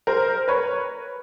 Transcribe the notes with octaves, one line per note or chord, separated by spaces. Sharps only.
A#4 C5
B4 C#5